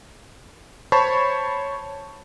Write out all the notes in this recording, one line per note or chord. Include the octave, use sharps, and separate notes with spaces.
C5 C#5 A5 B5 C#6